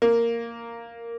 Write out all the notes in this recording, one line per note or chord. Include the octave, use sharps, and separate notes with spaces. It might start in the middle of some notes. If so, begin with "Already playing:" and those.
A#3